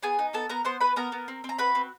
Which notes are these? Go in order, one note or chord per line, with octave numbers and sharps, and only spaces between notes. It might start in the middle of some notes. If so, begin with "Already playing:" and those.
B3 G#4 G#5
D#4
B3 A4 A5
B3 A#4 A#5
B3 C5 C6
B3 B4 B5
B3 A#4 A#5
B3
C4
C4
A#5
F#4 B4 B5
C4